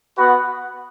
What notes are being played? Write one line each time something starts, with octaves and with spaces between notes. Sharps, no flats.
B3 F#4 B4 F#5